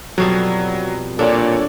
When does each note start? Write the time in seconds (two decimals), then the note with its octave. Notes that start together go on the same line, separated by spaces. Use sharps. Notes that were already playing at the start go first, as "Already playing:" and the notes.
0.18 F2 B2 F#3 G3
1.19 A#2 D4 A4 C#5 D5